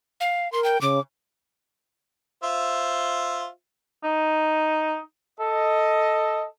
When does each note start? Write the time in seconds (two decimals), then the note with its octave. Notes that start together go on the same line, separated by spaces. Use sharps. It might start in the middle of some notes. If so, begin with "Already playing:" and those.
0.21 F5
0.52 A#4 C6
0.64 G5
0.81 C#3 D6
2.43 F4 C5 E5
4.04 D#4
5.40 A4 D#5